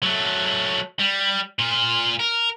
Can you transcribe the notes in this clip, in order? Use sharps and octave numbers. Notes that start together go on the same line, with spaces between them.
F#3 A3
G3
A#2 F4
A#4